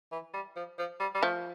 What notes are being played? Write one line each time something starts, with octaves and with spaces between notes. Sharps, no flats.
E3
G3
F3
F3
G3
G3
F3 A3